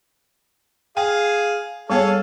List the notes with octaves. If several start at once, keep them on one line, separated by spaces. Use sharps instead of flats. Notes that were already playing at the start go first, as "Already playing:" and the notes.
G#4 F5 G5
G3 B3 G#4 A4 C#5 F5